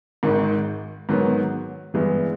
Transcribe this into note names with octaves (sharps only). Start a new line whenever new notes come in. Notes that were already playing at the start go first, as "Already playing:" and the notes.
G#1 G#2 D#3
G#2 D#3 F#3 B3
G2 E3 G#3 B3